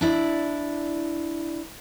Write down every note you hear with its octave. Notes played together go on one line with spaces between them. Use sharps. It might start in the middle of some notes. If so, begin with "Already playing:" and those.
D4 E4 D5